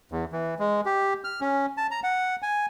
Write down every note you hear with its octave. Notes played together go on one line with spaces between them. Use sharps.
E2
E3
G#3
G4
F6
C#4
A5
A#5
F#5
G#5